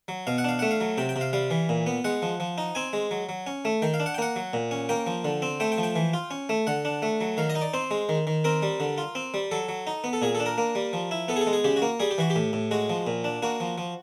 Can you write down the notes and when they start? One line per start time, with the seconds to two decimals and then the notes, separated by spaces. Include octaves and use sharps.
0.08 F#3
0.27 B2 F5
0.38 F#5
0.44 D4 F5
0.59 A3 F#5
0.71 F5
0.81 F#3
0.98 C3 G5
1.09 G5
1.16 C3
1.21 F5
1.33 G3 F5
1.51 E3
1.69 A#2
1.87 B3
2.04 G#3 F#5
2.22 F3
2.40 F3
2.58 D#4
2.75 C4 G#5
2.93 G#3
3.11 F#3
3.29 F#3
3.47 C#4
3.65 A3
3.82 D#3 G5
3.94 F5
4.00 D4
4.06 F#5
4.14 G5
4.18 A#3 F#5
4.36 F#3
4.53 A#2
4.71 C#4
4.89 A#3 G5
5.07 F3
5.25 D3
5.42 C4
5.60 A3 G5
5.72 G5
5.78 F3
5.83 G5
5.96 E3
6.14 F4
6.31 C#4
6.49 A3
6.67 D3 F#5
6.85 D4
7.02 A3
7.21 F#3
7.37 D#3 F5
7.50 D#5
7.55 D#4
7.61 D5
7.74 C4 C5
7.91 G#3
8.09 D#3
8.27 D#3
8.44 C4 A#4
8.63 G3
8.80 D3
8.98 F4
9.15 C4
9.34 G3
9.51 F#3 A4
9.69 F#3
9.87 D#4
10.04 B3
10.13 A4
10.22 A#2 G#4
10.35 A4
10.40 D4
10.46 A#4
10.58 A#3
10.75 G3
10.93 F3
11.11 E4
11.28 B3 A4
11.36 G#4
11.41 A4
11.47 G#3
11.53 G#4
11.64 C#3 G4
11.76 F#4
11.82 A#3
12.00 G3 G#4
12.11 G4
12.18 E3 F#4
12.30 G4
12.36 A2
12.53 A2
12.71 G#3 F#4
12.90 F3
13.07 A#2
13.24 D4
13.42 A#3 F#4
13.60 F3
13.78 F3